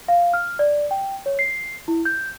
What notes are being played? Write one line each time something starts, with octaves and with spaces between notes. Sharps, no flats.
F5
F6
D5
G5
C#5
C7
E4
G6